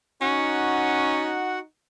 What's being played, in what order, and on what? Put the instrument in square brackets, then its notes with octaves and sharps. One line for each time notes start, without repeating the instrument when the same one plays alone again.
[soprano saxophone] C#4 [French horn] D#4 [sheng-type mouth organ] F#4 F#5